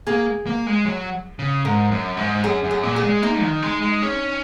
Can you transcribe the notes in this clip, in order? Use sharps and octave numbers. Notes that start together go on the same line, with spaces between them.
A#3 G#4
A#3
G#3
F#3
C#3
G#2 A#4
F#2
G#2
F#2 G#4
F#2
G#4
A#2
G#4
G#3
A#3 D#4
D#3
G#3
G#3
C#4